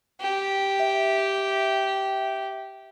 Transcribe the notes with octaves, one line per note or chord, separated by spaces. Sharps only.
G4
E5